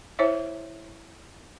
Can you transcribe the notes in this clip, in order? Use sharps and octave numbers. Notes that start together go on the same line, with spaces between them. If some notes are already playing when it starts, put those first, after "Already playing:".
E4 C5 C#5 E5